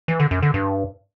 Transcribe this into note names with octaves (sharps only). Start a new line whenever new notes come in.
E3
D3
F#2
D3
G2